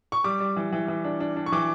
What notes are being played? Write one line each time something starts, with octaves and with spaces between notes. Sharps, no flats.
C#6
G3 D6
G3
E3
E3
E3
D4
D4
D4
C#6
E3 D6